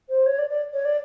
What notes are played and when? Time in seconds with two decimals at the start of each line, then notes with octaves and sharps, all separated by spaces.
0.09 C5
0.26 C#5
0.38 D5
0.50 D5
0.73 C#5
0.85 D5